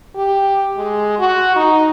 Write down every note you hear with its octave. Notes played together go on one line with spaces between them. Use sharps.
G4
G#3
F#4
D#4